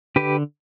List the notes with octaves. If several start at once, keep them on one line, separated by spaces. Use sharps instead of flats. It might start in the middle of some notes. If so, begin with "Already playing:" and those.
D3 G4 B4